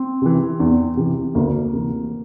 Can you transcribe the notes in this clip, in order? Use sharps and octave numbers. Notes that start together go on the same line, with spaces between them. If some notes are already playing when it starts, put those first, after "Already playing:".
Already playing: C4
C3 E3
E2
C3 E3
D2 A#3
C3 E3